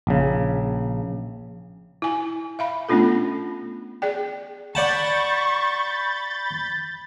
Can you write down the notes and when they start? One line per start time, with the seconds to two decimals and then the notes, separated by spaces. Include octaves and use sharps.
0.07 A#1 C#3
2.02 E4 G#5
2.59 E5 F5 B5
2.89 A3 B3 C#4 D4 F4 A4
4.02 G#4 D5 G5
4.75 D5 F#5 A5 B5 C#6 G6 A6